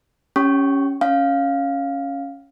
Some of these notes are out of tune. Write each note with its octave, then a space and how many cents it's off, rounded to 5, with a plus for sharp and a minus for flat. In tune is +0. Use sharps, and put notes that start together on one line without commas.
C#4 +0 G4 +0 C#6 +0
C#4 +0 F5 +0